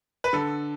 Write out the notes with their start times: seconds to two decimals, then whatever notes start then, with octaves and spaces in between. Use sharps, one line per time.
0.24 B4
0.33 D3 A4